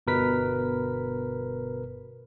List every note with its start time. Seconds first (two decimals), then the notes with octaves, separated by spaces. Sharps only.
0.07 G1 B2 A#4 B4 B6